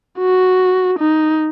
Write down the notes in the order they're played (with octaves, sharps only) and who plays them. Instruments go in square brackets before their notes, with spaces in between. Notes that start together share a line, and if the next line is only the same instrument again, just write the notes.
[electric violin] F#4
D#4